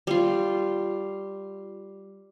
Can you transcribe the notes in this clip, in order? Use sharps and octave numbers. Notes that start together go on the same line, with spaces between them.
G3 F4